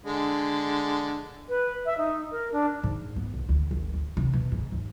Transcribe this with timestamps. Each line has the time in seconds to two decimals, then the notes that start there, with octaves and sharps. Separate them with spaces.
0.06 D3 G#3
1.49 B4
1.86 E5
1.98 D#4
2.31 A#4
2.52 D4
2.84 G#2
3.16 B3
3.34 B1
3.49 D2
3.71 G#1
3.94 D2
4.17 C3
4.33 B2
4.52 G#2
4.72 D#2